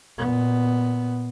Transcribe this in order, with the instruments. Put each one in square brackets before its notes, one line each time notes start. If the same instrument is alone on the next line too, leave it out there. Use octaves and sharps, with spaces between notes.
[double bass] A#2 B3